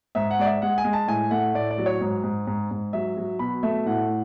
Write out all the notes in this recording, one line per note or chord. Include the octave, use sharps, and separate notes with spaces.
G#2 E5
F#5
G#3 D5
E5
G#3 F#5
G#5
G#3
A5
A2 G#5
A3 F#5
A2 D5
D5
F#3
C#5
G#2
G#2
G#2
G#2
F#3 E5
F#3
B2 B5
A3 E5
A2 F#5